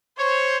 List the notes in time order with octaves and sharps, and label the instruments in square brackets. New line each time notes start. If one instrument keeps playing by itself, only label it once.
[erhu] C5 [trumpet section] C#5